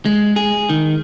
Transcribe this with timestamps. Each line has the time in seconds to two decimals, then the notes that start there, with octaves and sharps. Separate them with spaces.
0.05 G#3
0.36 G#4
0.69 D#3